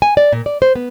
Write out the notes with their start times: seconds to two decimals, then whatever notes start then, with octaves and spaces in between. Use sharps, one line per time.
0.02 G#5
0.17 D5
0.32 A#2
0.46 D5
0.62 C5
0.76 B3